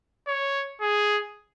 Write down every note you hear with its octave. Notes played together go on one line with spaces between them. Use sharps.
C#5
G#4